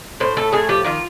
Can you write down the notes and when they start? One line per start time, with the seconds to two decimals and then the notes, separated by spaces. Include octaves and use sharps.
0.20 A2 C5
0.37 A3 A4
0.53 A2 G#4
0.69 F3 G4
0.84 D#3 F4